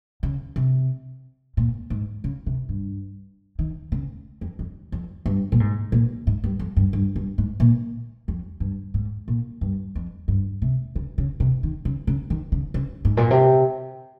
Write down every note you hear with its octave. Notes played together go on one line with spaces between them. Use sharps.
C#3
C3
A#2
G#2
C#3
C3
G2
D#3
C#3
F2
F2
F2
G2
A#2
G#2
A#2
G#2
G2
F2
G2
G2
G2
G#2
A#2
F2
G2
G#2
A#2
G2
F2
G2
C3
C#3
C#3
C3
D#3
C#3
C#3
D#3
C#3
C#3
G#2
A#2
C3